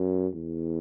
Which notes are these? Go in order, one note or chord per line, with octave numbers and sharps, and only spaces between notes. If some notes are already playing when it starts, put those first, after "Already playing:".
Already playing: F#2
E2